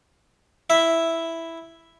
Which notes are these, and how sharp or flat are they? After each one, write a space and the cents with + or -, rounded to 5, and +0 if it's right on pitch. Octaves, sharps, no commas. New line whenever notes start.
E4 +0 E5 +0